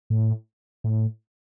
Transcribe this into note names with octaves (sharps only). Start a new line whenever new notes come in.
A2
A2